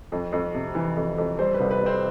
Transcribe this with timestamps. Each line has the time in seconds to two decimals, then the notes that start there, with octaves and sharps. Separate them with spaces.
0.12 F2
0.32 F2
0.55 C3
0.75 E3
0.96 F2
1.18 F2
1.39 G3 C4 C5
1.54 B4
1.60 C2
1.71 B4
1.81 C3
1.86 C4 C5